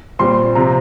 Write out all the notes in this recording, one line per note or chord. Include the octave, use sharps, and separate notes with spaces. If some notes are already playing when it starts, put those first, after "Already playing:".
A#2 G3 C4 C6
C3 F3 C4 A#5